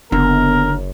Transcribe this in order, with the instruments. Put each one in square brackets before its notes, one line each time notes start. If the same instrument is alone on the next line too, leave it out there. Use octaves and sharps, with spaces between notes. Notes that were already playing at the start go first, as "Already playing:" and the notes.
[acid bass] F#1 [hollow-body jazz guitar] D3 [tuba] B3 [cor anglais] A#4